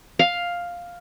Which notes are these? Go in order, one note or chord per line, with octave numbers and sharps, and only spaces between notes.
F5